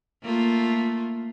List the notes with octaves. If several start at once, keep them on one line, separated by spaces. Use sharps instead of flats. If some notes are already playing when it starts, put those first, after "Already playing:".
A3 A#3 F4